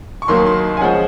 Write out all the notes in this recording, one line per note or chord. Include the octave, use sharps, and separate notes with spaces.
C#6
D#2 D#3 F#3 A#3 C6
C6
G#5
F3 G#3 C#4 F#5